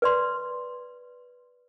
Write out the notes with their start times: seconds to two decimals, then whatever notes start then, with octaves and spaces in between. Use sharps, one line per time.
0.02 B4 D5 C6